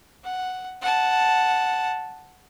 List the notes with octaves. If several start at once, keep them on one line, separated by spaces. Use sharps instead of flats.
F#5
F#5 A5